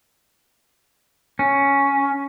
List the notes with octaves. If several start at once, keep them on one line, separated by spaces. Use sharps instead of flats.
C#4